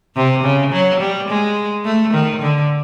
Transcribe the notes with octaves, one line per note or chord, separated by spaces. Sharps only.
C3
C#3
F#3
G3
G#3
A3
D#3
D3